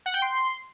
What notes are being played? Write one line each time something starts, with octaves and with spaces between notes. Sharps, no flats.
F#5
G5
C6